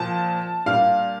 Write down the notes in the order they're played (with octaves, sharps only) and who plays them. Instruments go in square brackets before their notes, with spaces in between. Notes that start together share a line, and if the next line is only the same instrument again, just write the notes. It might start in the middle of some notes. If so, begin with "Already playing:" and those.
Already playing: [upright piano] A#2 F3 C4 A5
A#2 G3 D4 F5